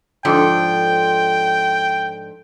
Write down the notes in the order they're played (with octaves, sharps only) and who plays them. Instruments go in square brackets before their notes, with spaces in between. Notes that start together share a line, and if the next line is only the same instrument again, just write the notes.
[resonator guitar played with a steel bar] G#2 D3 F3 [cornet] G5